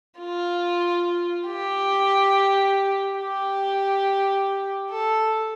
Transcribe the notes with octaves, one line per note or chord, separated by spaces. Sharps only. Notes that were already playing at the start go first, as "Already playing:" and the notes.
F4
G4
G4
A4